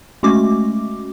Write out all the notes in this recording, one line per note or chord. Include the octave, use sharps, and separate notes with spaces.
G#3 A3 C#4 F#4 D6